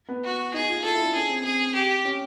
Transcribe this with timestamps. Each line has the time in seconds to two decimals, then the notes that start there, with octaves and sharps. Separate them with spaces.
0.09 B3
0.24 F#4
0.54 D#4 G#4
0.69 F4
0.84 F4 A4
0.94 E4
1.05 D4
1.14 C#4 G#4
1.30 C4
1.44 C4 G#4
1.74 G4
2.05 C#4